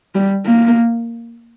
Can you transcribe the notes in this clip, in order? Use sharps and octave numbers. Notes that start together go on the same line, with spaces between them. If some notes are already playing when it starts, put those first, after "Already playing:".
G3
A#3